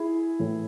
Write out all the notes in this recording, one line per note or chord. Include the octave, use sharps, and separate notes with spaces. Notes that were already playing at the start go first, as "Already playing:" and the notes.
Already playing: E4 G#4
A2 E3